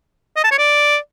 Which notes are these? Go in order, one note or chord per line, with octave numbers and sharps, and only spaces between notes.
D#5
A5
C#5
D5